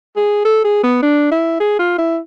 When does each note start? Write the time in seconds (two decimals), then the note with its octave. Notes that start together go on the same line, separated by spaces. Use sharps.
0.16 G#4
0.45 A4
0.65 G#4
0.84 B3
1.03 D4
1.31 E4
1.60 G#4
1.79 F4
1.98 E4